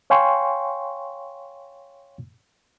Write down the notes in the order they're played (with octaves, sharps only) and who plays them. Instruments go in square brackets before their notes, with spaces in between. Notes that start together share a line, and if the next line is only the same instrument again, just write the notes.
[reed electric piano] C#5 F5 G5 G#5 C6 C#6